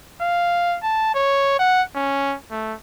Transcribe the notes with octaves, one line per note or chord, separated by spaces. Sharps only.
F5
A5
C#5
F#5
C#4
A3